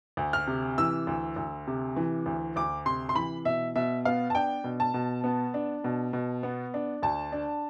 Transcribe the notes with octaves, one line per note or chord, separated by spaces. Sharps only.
D2
F6
C3
E3 E6
D2
D2
C3
E3
D2
D2 D6
C3 C6
C6
E3 B5
B2 E5
B2 E5
B3 F5
A5
D4 G5
B2
A5
B2
B3
D4
B2
B2
B3
D4
D2 A5
D4